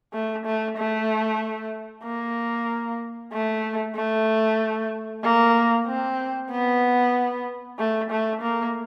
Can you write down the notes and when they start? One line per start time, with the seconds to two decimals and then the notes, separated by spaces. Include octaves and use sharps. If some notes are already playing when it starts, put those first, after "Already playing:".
0.13 A3
0.46 A3
0.77 A3
2.05 A#3
3.33 A3
3.96 A3
5.23 A#3
5.87 C4
6.51 B3
7.79 A3
8.11 A3
8.42 A#3